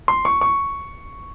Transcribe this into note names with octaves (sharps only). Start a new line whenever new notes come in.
C6
C#6
C#6